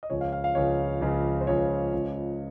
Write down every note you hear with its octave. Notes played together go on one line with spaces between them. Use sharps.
D#5
C#2 C#3 F3 C#5
F5
F5
F5
C#2 C#3 F3 C#5
C#2 C#3 F3
C5
C#2 C#3 F3 C#5
C#2 C#3 F3